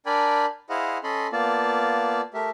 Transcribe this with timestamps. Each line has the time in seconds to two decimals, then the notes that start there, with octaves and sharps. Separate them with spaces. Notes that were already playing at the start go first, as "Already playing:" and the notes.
0.06 D4 A#4 D5 G5 G#5 B5
0.70 E4 G#4 C5 D#5 F5 F#5
1.04 C#4 A4 D#5 B5 C6
1.32 A#3 B3 F4 D5 A5
2.34 A3 G4 A#4 E5